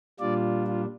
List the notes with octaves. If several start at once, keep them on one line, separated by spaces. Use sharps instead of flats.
A#2 G3 D4 F4 D5
F4